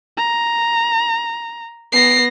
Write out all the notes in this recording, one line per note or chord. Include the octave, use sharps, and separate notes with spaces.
A#5
B3 A#6 C7